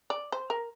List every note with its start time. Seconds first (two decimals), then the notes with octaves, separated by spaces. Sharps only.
0.10 D5
0.32 C5
0.50 A#4